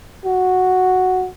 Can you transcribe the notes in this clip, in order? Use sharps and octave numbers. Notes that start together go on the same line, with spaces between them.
F#4